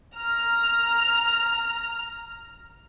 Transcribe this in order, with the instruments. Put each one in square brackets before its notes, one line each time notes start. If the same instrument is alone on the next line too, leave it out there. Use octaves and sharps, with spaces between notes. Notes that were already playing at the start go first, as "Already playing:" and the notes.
[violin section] A#5 F6